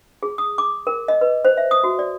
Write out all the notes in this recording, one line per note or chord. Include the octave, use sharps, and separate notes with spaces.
G#4
D#6
D6
A#4
D#5
B4
C5
E5
D#6
F#4
D5